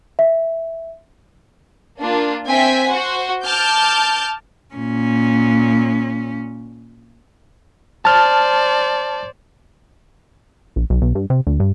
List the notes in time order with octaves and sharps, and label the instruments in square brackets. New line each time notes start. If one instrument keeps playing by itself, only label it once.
[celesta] E5
[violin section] A#3 D4 F4
C4 E5 G5 G#5 B6
F#4 C5 F#5
A5 D6 F6 G6
[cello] A#2 C#4
[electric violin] C5 D5 [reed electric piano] A5 F6
[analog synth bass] A#1
B1
B1
G2
C3
D2
G2